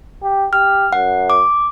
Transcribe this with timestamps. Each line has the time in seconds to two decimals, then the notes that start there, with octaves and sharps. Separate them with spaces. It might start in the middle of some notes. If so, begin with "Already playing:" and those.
0.23 G4
0.53 G4 F6
0.93 F#2 F#5
1.30 D6